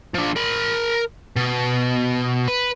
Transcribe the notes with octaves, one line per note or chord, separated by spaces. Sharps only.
F3 D4
A#4 B5
B2
B4